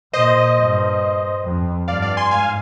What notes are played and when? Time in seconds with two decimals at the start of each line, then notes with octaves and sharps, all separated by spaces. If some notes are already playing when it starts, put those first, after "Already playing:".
0.13 A#2 C5 D#5
0.57 G2
1.44 F2
1.88 G2 D5 F5
2.02 D5 F5
2.17 G#5 C6
2.31 G#2 F5 G#5
2.43 F5